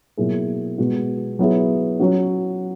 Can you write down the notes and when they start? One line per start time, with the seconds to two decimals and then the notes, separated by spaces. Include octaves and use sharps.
0.17 B2 F#3 A#3 E4 G#4
0.78 B2 G#3 B3 F#4
1.39 F#3 B3 E4 G#4
2.00 F#3 C#4 F#4